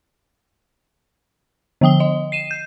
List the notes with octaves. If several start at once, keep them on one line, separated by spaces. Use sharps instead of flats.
D3 F3 G5 D#6 G7
D#5
C7 D#7 E7
G6